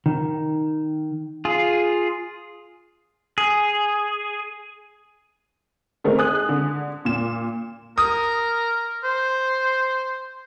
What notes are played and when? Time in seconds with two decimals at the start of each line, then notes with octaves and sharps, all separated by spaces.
0.06 D#3
1.45 F4 G#4
3.38 G#4
6.04 D#3 G#3 A3 C4 D#4 A#4
6.18 G#4 D#6 F#6
6.49 D3
7.05 A#2 E7
7.98 A#4 D#6
9.04 C5